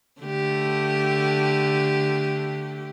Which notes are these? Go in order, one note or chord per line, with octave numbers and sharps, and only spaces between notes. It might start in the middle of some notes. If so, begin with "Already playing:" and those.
D3 A3 G4